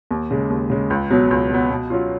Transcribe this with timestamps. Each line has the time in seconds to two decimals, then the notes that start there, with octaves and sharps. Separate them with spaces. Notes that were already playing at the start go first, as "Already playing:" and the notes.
0.11 D#2
0.31 C#3 G#3
0.50 D#2
0.70 C#3 G#3
0.90 C#2
1.10 B2 F#3 B3
1.31 C#2
1.50 B2 F#3 B3
1.71 B2
1.90 F#3 C#4 F4